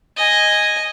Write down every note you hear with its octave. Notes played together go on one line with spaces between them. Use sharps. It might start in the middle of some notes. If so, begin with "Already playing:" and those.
D#5 G#5